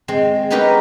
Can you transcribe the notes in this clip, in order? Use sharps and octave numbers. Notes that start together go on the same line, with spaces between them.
G#3 C4
B3 C#4 D#4 G4 A#4 B4